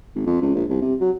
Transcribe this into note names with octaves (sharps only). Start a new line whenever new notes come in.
G#1
F2
C#2
A#1
C2
C3
F#3